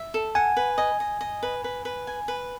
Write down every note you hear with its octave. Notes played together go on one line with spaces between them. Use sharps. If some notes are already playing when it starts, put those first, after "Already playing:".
Already playing: E5
A4
F#5 G#5
B4
D#5 G#5
D#5
D#5
B4
B4
B4
G#5
B4